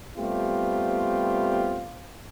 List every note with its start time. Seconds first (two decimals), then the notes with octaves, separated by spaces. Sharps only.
0.18 G3 A3 B3 C4 F4 G4